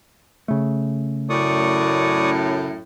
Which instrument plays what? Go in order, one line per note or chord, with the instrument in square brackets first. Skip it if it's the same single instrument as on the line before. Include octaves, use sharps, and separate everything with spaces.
[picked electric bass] C#3 A3
[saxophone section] F#2 A2 [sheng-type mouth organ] D5 C#6 D#6